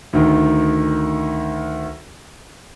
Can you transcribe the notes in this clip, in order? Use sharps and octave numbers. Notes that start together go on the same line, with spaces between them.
D2 D#3